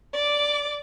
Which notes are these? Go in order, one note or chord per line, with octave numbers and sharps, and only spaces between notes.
D5 D6